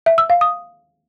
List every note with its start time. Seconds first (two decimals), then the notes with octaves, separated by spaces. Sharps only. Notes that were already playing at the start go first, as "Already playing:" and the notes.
0.06 E5
0.18 E6
0.30 F5
0.41 D#6